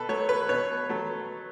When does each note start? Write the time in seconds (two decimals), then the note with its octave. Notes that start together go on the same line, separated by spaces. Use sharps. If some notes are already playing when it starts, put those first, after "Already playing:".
Already playing: B2 A4 B4
0.09 F#3 A3 C#5
0.29 B4
0.49 B2 C#5
0.89 F#3 A3